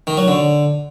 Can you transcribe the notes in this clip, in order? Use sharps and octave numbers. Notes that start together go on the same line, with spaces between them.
D#3
F#3
D3